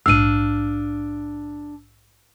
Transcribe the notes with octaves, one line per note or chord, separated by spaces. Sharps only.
A#1 G#2 D4 F5 E6 F6 D#7